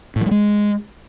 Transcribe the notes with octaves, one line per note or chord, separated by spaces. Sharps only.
A2
F3
G3
G#3